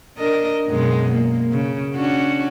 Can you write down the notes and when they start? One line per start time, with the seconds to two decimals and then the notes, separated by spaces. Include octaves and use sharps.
0.18 D4 A#4 D#5
0.67 F#2 B2 G#3
1.11 A#3
1.51 C#3
1.95 C#4 D4 F#4